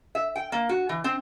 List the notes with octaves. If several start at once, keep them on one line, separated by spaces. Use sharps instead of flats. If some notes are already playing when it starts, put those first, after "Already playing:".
E5
G5
A#3
F#4
E3
C4